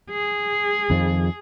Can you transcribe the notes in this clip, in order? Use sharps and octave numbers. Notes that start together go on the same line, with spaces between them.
G#4
F2 D#3 F3